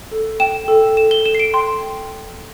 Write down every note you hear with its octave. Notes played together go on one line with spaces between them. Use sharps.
A4
G5 E7
A4
A4 E7
G7
A4 E7
C7
D7
G5 C6